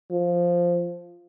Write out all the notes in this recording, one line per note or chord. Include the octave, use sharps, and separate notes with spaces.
F3